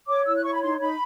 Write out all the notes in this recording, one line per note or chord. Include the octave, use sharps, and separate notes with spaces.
C#5 D6
E4 E6
F#6
C#5 C#6
B5
D#4 C6
D#4 B5